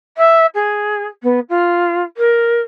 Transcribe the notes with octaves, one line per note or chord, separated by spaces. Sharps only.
E5
G#4
B3
F4
A#4